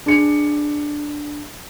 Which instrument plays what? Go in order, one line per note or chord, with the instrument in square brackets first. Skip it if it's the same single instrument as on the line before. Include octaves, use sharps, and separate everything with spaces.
[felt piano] D4 G#4 C#7